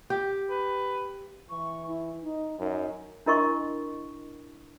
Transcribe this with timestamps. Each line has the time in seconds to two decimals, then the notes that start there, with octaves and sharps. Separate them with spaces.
0.10 G4
0.50 B4
1.50 E3 C#6
1.88 E4
2.22 D#4
2.59 F#2 D#4
3.26 D4 E4 A#4 D#5 C6 C#6